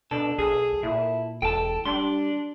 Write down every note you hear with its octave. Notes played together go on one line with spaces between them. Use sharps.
B2 D4 A4
B1 G#4
A#2 E4
E1 A4 G5 A5
G3 D4 C6